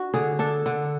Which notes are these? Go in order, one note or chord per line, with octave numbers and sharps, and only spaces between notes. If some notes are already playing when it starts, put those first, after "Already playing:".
Already playing: D4 F#4
D3 G#4
D4 A4
D3